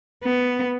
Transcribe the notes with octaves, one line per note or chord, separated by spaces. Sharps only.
B3